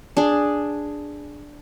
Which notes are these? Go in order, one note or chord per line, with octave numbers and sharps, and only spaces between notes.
D4 G#4